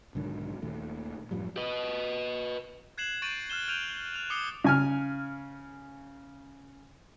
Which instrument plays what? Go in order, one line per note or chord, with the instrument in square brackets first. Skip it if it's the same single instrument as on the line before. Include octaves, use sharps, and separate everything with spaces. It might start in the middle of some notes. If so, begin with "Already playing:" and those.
[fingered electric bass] B1 G#2 D3 D#3
D#2 A#2 D#3 A3
F#2 A2 F3 G3
[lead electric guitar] B4 D#5
[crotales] F#6 G#6 C7 E7 F#7
C#6 G6 A6 D7 D#7 F#7
F6 F#6 E7 G7
F6 G6 D7 D#7 F7
F#6 F7
D6 D#6 C7 C#7 G7
[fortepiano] C#3 G#5 F6